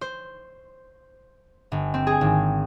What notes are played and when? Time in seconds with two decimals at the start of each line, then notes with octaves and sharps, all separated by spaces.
0.01 C5
1.72 G1
1.94 C4
2.07 G#4
2.21 G#1